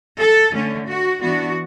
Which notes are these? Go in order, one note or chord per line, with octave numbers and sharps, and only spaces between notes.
A4
D3 A3 C#4
F#4
E3 B3 D4 F#4